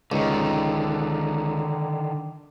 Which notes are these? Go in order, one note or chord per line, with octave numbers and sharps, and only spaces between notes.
C#2 D3 D#3